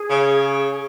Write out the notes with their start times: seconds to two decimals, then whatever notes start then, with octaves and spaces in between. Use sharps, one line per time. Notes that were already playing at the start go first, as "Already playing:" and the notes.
Already playing: G#4
0.10 C#3